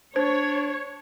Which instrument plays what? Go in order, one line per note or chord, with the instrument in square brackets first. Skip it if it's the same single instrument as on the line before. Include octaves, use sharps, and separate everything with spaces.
[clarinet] D4 [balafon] C5 [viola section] C#5